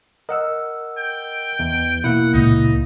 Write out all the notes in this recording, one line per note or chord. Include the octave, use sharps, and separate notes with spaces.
A#4 D#5 F#5 E6
G5
E2
B2 A#3 E4 F#5
C#2 A#2 D#4